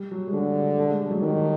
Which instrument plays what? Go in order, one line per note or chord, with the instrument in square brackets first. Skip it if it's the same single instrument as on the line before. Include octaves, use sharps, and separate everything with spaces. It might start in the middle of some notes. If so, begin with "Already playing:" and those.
Already playing: [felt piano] G3
F#3
G#3
[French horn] D3 [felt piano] G3
[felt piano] A3
G#3
G3
F#3 G#3
[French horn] D#3 [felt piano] G3